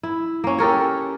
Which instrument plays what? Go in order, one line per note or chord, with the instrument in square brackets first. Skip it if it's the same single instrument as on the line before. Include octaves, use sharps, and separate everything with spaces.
[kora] E4
A#3 C#4
G4 A4 A#4 C#5